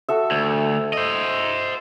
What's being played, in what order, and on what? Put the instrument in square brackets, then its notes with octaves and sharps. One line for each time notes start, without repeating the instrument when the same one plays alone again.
[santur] F#4 A4 E5
[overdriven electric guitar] D2
C5 D#5